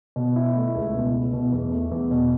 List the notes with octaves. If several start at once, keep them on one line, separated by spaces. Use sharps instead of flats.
B2
E4
A3
C#2
B2
E4
B2
E2
A3
E2
B2